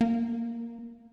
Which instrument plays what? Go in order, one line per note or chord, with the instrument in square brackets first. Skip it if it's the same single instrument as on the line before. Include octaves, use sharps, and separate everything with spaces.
[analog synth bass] A#3